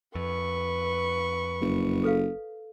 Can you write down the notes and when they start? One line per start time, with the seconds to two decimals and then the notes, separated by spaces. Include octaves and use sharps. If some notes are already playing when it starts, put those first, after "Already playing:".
0.15 F2 B4 C#6
1.61 F#1
2.04 A4 B4 F5